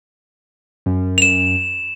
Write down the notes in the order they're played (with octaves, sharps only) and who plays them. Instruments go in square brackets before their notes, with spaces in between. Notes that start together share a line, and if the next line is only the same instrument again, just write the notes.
[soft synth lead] F#2
[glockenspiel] E7 F7